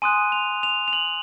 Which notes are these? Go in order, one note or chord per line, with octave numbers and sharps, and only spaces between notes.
G#5 C6 D#6 F#6 D#7
F7
F7
F7
F#7